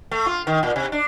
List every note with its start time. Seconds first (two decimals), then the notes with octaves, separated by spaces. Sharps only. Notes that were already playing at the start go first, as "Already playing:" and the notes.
0.11 A3
0.26 F4
0.47 D#3
0.63 A#2
0.76 C3
0.92 D4